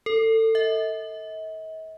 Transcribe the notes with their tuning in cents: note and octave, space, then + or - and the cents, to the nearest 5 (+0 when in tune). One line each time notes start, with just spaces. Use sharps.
A4 +25
D#5 +45